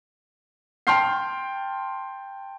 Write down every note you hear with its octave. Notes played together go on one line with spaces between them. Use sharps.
G5 A5 C6 F6 G6 C7